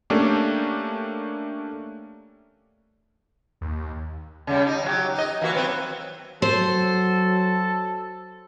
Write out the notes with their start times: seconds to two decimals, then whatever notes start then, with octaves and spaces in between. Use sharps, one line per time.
0.10 A3 A#3 C#4 D4 G4
3.61 D#2
4.47 C#3 G3
4.66 D#4
4.84 F#3 F4 G4
5.14 D#4 D#5
5.41 E3 A#3 F#4
5.53 F#3 B3 C4
6.42 F#3 A4 C5